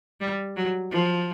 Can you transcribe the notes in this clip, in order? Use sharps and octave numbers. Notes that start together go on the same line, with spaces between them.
G3
F#3
F3